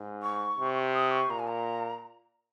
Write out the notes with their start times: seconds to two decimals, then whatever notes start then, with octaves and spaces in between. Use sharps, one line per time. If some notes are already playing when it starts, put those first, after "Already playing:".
Already playing: G#2
0.23 C#6
0.58 C3
0.94 D#6
1.11 C#6
1.29 A#2 A#5
1.39 G#5
1.48 A#5